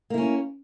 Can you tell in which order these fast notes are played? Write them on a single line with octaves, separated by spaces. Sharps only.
A#3 E4 C#4